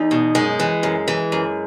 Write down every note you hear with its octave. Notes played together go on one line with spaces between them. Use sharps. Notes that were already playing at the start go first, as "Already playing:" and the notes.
Already playing: E2 D#4
B2
F#2 G#3
E3
F#2
E3
F#2